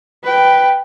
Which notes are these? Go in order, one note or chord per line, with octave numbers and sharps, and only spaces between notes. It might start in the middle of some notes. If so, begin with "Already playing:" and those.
B4 G5